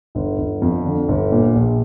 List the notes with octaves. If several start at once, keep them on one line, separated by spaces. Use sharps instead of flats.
G1
G1
F2
D3
G1
A#2
A#1